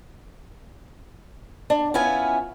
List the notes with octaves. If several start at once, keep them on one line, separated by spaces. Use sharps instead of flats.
D4
B3 C#4 E4 F4 G#5